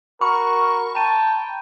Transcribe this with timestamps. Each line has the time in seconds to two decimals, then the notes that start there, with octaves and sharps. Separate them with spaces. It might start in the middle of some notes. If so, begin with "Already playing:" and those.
0.21 F#4 A#4 B5 C#6
0.95 G5 A5 A#5 D#7